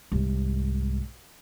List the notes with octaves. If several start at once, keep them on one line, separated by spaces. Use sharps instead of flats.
C2 G#2